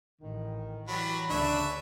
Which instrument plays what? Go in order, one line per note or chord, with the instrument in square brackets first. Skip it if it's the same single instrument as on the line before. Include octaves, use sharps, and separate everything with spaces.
[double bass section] A1 [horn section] D#3
[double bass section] E3 [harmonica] F#3 G3 [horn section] B5
[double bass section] D2 C#3 [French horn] D4 [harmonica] B4 C#5 E5